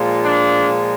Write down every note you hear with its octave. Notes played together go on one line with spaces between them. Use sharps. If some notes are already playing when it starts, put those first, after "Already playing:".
Already playing: A#2 F3 G#3
D4